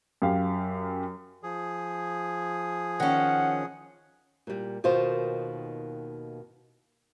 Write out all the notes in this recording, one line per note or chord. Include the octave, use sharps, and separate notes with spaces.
F#2 G4 F5
F3 G#4
D#3 C#4 F#5
A#2 G3
D#2 B2 D#3 F4 C5